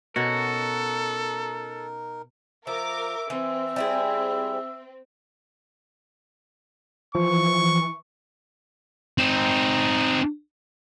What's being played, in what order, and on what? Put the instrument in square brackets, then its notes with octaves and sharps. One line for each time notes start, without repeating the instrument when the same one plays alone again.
[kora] B2 C#4 [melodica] D#4 A#4 [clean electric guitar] F#4 [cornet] A4
[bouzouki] F3 [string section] A#4 D6 [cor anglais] E5
[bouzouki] E3 [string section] C4 [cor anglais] E5
[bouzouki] G3 E4 G#4
[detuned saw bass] E3 [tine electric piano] F3 [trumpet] C#6
[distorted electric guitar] C4 D#4